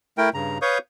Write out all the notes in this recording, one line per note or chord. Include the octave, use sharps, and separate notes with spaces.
A3 E4 A#4 G5
G2 C#3 A#5
B4 C#5 F5 C#6 D#6 G6